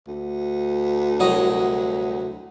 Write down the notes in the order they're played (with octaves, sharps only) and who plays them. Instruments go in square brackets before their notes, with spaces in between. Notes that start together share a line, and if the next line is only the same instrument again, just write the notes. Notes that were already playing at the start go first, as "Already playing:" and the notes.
[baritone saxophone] D2
[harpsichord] C2 F#3 D#5